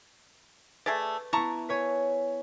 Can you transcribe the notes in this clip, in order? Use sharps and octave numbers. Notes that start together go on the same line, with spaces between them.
A3 G#4 B4 D5
B3 E4 A5 A#5 C#6
B4 C#5 G#5